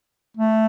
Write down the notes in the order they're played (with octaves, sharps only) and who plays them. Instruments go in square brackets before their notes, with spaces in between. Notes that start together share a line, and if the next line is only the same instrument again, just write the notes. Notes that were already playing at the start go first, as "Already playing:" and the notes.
[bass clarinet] A3